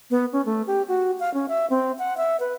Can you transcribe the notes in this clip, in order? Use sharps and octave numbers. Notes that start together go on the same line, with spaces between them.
B3
C#4
A3
G4
F#4
F5
C#4
E5
C4
F#5
E5
B4